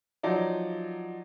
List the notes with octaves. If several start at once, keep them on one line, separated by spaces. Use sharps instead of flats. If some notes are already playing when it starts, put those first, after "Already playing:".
F3 F#3 D#4 D5